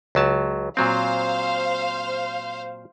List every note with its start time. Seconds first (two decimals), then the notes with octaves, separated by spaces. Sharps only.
0.15 C#2 F#3 A5
0.77 A#2 F#3 C4 C5 F5